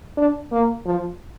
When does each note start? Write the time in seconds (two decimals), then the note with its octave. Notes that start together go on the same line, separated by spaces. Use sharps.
0.17 D4
0.52 A#3
0.86 F3